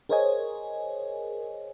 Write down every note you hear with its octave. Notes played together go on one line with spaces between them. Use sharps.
G#4 A#4 C5 C#5 D#5 G#5